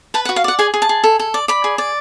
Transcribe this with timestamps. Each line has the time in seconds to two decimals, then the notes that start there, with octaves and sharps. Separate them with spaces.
0.14 B4 A5
0.25 F#5
0.29 F#4
0.36 F5
0.44 D5 F#5
0.59 G#4 G#5
0.74 G#4
0.82 A5
0.89 G#4
1.04 A4
1.19 A4
1.34 D5
1.48 D5 B5
1.64 G#4
1.78 D5